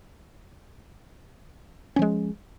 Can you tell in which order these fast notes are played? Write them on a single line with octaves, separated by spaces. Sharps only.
C#4 F3 G#3